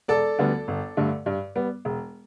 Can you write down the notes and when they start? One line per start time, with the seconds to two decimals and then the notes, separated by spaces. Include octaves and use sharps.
0.08 E1 A4 D5
0.38 D2 D3 G3 B3
0.68 G1
0.97 G2 D3 A3
1.26 G2
1.55 G3 B3
1.85 E1